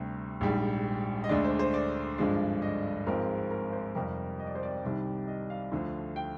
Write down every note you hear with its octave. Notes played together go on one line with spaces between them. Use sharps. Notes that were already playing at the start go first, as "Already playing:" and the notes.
Already playing: D2 C3 G3
A#1 G#2 G3
D#5
D2 D3 G#3 D4 D5
C5
C5
D5
G#1 G2 D3 F3 G#3
D#5
G#1 G#2 F3 G#3 C4 A#4
A#4
C5
F2 C3 G3 A#4
D#5
D5
C5
D5
C2 C3 D#3 G3
D#5
F5
D2 D3 F3
G5